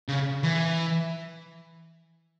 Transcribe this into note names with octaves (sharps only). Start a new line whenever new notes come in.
C#3
E3